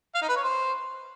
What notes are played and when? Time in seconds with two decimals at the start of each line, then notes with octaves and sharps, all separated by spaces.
0.15 F5
0.22 D#4
0.29 B4
0.36 C#5
0.43 C5